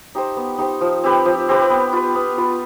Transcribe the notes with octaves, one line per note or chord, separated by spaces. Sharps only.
D#4 G4 C5
B3
D#4 G4 C5
F3
C4 G4 B4
F3
C4 G4 B4
B3
F4 B4
B3
F4 B4